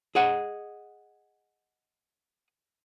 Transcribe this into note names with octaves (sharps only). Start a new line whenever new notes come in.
G#4 D#5 F#5